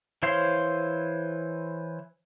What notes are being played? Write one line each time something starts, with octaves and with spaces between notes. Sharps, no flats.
E3 C5 C#5 F5 C6